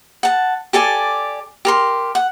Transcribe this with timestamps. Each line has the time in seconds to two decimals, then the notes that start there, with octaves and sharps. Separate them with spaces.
0.23 F#5 A5
0.73 G4 A4 D5 G#5
1.65 G4 A#4 C6
2.15 F#5